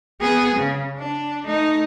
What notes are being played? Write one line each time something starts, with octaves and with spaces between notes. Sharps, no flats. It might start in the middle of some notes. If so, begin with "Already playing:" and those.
B3 G#4
C#3
D4
A3 D#4